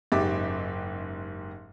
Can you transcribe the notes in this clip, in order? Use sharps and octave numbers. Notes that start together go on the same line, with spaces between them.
F#1 G#2 G4 E5 D6 A6